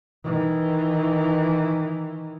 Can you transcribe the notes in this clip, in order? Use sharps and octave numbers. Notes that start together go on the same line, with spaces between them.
D#3 E3